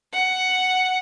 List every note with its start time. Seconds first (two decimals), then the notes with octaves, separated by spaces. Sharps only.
0.13 F#5